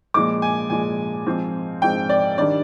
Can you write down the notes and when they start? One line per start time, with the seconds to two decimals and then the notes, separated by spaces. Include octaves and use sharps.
0.14 A#2 F3 G#3 D6
0.42 G#5
0.70 A#2 F3 G#3 G#5
1.26 G#2 F3 C4
1.82 G#2 F3 C4 G5
2.09 D5
2.38 D#3 G3 D4 D5